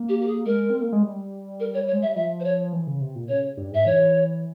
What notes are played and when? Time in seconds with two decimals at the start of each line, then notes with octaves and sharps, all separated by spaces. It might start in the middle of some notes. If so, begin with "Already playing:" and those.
Already playing: A#3
0.09 G4
0.21 G4
0.28 G#4
0.46 G#3 A#4
0.70 C4
0.81 A#3
0.92 G#3
1.03 G3
1.60 A#4
1.74 C#5
1.87 C#5
1.92 G#3
2.02 G3 E5
2.16 F3 E5
2.40 C5
2.44 C#5
2.73 E3
2.87 C#3
3.01 C3
3.16 A#2
3.29 C#3 C#5
3.57 G2
3.72 G#2 E5
3.86 E3 C#5